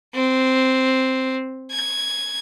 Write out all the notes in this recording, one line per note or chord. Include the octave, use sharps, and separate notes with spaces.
C4
G#6